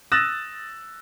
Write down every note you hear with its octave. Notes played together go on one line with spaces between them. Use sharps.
D#6 E6 F#6 A6 A#6 E7